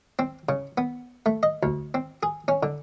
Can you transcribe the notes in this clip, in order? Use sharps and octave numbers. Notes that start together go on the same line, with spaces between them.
C4
C#3
B3
A3
D#5
D2
C4
G#4
C#4
D3